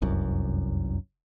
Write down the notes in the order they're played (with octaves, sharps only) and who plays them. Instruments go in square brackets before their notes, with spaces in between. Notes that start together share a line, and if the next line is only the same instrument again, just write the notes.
[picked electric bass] F1 C2 F#2